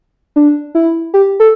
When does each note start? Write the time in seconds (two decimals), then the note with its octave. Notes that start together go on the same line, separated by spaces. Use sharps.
0.36 D4
0.75 E4
1.14 G4
1.40 A4